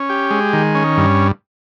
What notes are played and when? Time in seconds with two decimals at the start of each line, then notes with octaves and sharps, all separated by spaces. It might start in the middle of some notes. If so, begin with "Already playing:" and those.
Already playing: C#4
0.09 G4
0.31 G#3
0.53 D#3
0.75 C#4
0.97 G2